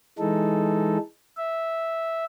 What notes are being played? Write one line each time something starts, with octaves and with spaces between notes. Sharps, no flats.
E3 G#3 D#4 A4
E5